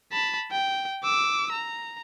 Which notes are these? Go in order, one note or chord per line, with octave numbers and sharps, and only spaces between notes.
A5 B5
G5
D6 E6
A#5